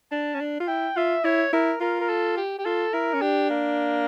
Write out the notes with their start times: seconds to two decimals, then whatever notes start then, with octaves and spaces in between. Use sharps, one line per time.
0.12 D4 A5
0.34 C#4
0.41 D4
0.60 F4
0.68 E4 G5
0.96 F4 E5
1.24 E4 C#5
1.53 E4 A#4
1.81 F4 A#4
2.01 A#4
2.09 A4
2.37 G4
2.58 G4
2.65 F4 A4
2.93 E4 A#4
3.14 C#4
3.21 D4 G4
3.50 A#3